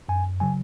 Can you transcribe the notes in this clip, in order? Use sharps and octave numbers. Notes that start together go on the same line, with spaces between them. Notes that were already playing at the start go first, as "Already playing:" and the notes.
F#2 G#5
C#3 F#3 G#5